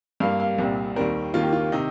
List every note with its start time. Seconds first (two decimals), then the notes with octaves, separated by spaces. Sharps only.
0.20 G2 G3 A#3 F5
0.40 F5
0.58 C2 A#2 G3 C4
0.96 D#2 D#3 G3 C4 A#4
1.34 D#2 D#3 A#3 F4
1.43 G4
1.53 F4
1.72 C3 D#3 D#4